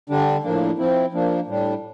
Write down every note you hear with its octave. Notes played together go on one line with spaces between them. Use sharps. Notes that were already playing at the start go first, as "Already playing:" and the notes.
D3 G3 D4
A2 F3 A#3 D4
F3 C4 E4
F3 A#3 D4
A2 G3 D4